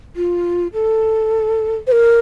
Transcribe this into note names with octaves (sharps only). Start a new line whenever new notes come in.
F4
A4
C5
A#4